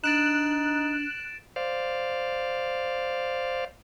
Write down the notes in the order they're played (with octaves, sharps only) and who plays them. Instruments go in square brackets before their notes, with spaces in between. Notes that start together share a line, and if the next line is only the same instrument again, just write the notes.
[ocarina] D4 [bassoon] D#4 [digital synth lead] F#6 [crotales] A6 D7 E7
[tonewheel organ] C5 D5 F5